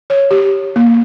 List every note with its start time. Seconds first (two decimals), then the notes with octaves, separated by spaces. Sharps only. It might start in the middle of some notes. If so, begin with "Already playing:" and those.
0.10 C#5
0.31 G4
0.76 A#3